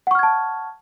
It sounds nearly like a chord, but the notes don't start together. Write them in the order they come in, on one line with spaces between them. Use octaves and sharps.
F#5 C#6 F6 G#6 A5